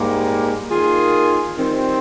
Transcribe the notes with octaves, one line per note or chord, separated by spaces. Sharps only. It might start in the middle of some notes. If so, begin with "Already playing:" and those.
Already playing: G#2 G3 A#3
D#3 A#3 F4 G#4
D#3 G3 C4